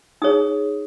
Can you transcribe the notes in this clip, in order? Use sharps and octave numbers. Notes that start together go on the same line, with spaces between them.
D#4 G#4 C#5 D#6